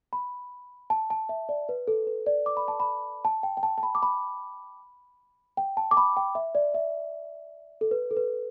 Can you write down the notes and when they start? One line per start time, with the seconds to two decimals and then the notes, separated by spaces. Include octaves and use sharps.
0.13 B5
0.90 A5
1.10 A5
1.29 E5
1.49 D5
1.69 B4
1.88 A4
2.07 B4
2.26 D5
2.46 D6
2.57 B5
2.68 A5
2.80 B5
3.25 A5
3.43 G5
3.57 G5
3.63 A5
3.78 A5
3.83 B5
3.95 D6
4.03 B5
5.57 G5
5.77 A5
5.91 D6
5.97 B5
6.17 G5
6.35 E5
6.55 D5
6.74 E5
7.81 A4
7.91 B4
8.11 A4
8.17 B4